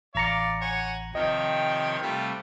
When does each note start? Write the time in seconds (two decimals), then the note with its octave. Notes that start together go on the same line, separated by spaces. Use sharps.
0.15 A1 D5 F5 A#5 C#7
0.61 C#5 F#5 G#5
1.15 C3 D#3 F3 G4 C#5 D#5 G5
2.02 C3 G3 A3 F4 G4